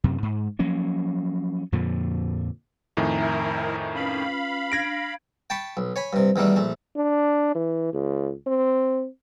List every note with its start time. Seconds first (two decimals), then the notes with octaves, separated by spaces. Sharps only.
0.04 F#2 C3
0.22 G#2
0.59 F3 F#3 A#3 C#4
1.72 F2 A#2 D3 F3
2.97 F2 A2 D#3 E5 G#5 A#5
3.19 E4 A#4
3.95 C#4 F4 B4 F5 B5
4.72 D4 G#6 A#6 D7
5.50 G5 A5 B5 C#6
5.77 B1
5.96 C#5 G#5 B5
6.13 G2 C3
6.36 E2 D#3 G3 A3
6.56 A#1 A3
6.96 D4
7.55 E3
7.93 C#2
8.47 C4